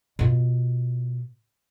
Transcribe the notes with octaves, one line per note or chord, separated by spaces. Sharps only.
B2 F4